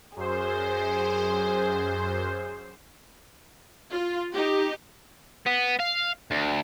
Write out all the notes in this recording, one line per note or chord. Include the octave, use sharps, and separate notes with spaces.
F#2 G#4 C5
F4
D#4 G4
B3
F5
D2